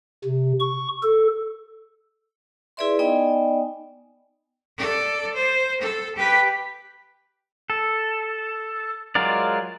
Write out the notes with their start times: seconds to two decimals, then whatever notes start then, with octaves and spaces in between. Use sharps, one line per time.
0.25 C3
0.60 C#6
1.03 A4
2.77 E4 G#4 B4 D5 E5 C6
2.99 B3 D#4 D5 D#5 G5 G#5
4.78 A4 D5
5.35 C5
5.81 A4
6.16 G4 B4
7.70 A4
9.15 F#3 G#3 F4 A#4 D5